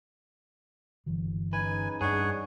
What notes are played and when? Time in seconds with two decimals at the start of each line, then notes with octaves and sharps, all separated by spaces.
1.06 G1 E3 F#3
1.53 G#3 C#4 D#4 B4 G#5
2.01 G2 D4 G#4 C#5 F#5